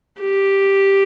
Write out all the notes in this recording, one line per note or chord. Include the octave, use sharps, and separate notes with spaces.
G4